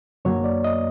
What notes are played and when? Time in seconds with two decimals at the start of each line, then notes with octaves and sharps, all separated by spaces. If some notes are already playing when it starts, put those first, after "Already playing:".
0.25 F#2 D3 F#3 A#3 C#5
0.44 D5
0.64 D#5